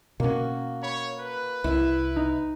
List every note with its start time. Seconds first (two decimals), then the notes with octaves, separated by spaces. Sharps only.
0.20 B2 A#3 C#4 F#4
0.83 C#5 B5
1.20 B4
1.64 C2 E4 E5
2.16 D#4